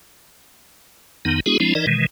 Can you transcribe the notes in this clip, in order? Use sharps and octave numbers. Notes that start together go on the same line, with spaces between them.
F2 D#3 B3 D#4
G#3 B3 D4 E4 F#4 G#4
F3 G#3 C4 D4 E4
E3 D#4 A#4 D5 D#5
B2 D#3 E3 G#3